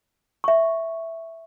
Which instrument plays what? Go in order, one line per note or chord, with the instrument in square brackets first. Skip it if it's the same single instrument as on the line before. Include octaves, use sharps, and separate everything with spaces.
[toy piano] E5 C#6